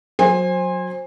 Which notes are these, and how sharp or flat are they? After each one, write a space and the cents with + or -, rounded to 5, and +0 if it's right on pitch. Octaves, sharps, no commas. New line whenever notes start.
F#3 -20 C5 +15 G#5 -25